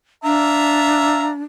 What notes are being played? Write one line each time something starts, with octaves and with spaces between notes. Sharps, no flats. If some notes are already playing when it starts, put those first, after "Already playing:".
D4 E5 F5 A#5